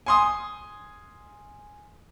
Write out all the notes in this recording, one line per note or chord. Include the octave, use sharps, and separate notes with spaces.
G#5 C6 D#6